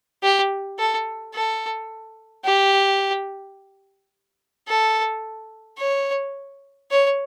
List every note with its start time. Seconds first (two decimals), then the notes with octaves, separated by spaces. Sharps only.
0.23 G4
0.79 A4
1.34 A4
2.45 G4
4.69 A4
5.79 C#5
6.91 C#5